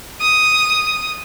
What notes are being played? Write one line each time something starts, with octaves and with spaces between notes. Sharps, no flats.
D#6